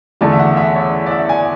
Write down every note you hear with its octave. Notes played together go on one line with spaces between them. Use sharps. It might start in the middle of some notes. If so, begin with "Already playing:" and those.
E2 D3 A3 A5
E5
F#5
E5
C#5
D5
E5
G#5